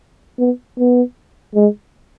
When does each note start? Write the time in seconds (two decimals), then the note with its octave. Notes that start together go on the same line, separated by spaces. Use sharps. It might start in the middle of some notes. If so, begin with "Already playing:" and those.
0.39 B3
0.79 B3
1.55 G#3